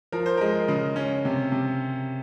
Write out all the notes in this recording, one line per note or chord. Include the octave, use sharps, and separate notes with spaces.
F3 A#4
C5
G#3 A#4
C#3
C#4
C3
C3